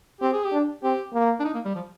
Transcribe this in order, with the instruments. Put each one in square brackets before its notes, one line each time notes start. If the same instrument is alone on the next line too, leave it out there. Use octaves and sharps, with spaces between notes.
[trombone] C4 [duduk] G4
[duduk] G#4
G4
[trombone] D4
[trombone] C4 [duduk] G4
[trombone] A#3
[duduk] D4
D#4
A#3
G3
F3